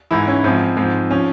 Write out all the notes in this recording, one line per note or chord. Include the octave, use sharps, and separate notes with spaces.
G#2 E3 E4
C#4
G#2 F3 C4
G#2 F3 C4
F3 C#4